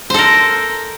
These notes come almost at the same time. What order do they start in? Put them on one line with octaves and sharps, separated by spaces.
C5 A4 A#4